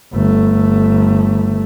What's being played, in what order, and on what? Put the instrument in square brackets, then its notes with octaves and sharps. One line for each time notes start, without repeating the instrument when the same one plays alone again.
[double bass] G1 A3